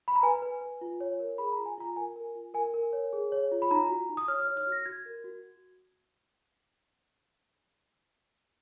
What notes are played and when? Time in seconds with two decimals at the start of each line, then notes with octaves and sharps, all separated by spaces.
0.08 B5
0.16 A#5
0.23 B4 G#5
0.42 B4
0.61 B4
0.81 F4
1.00 C#5
1.20 A#4
1.38 G#4 B5
1.52 A#5
1.58 F4
1.66 G#5
1.78 F4 A#5
1.96 A#4 G#5
2.16 A#4
2.35 F4
2.54 A#4 G#5
2.74 A#4
2.93 C#5
3.13 G#4
3.32 C#5
3.52 F4
3.62 B5
3.71 D#4 A#5
3.89 F#4
4.09 D#4
4.17 D#6
4.28 C#5 F6
4.42 F6
4.48 C#5
4.57 F6
4.67 F#4
4.72 A#6
4.86 F#4 G#6
5.06 A#4
5.24 F#4